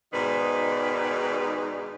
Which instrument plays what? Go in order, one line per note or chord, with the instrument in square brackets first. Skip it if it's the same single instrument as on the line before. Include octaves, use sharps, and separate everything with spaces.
[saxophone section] G#2 B2 D#3 D#4 B4 D5